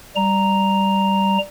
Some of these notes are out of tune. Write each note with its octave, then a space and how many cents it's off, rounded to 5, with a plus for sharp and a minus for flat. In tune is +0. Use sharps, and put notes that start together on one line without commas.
G3 +0 A#5 +0